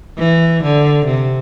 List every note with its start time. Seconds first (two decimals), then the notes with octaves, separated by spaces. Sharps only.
0.18 E3
0.63 D3
1.06 C3